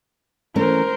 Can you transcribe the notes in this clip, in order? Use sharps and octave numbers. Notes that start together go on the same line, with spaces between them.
E3 A3 C#4 A#4 C5